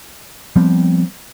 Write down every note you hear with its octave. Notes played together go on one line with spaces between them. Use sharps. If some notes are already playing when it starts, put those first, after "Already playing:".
F3 G3 B3 C4